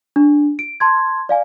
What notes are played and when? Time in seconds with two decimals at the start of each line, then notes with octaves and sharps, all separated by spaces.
0.16 D4
0.59 D7
0.80 A5 C6 G#6
1.29 D5 F5 G#5